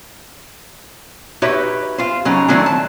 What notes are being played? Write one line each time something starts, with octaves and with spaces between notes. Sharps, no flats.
D#4 F#4 G4 B4 C#5 E5
F4 C5
C#3 F#3 C#4 D#4
D#3 F#3 A3 C4 D4 E4
A5